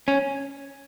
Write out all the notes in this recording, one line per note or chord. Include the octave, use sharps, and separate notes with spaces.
C#4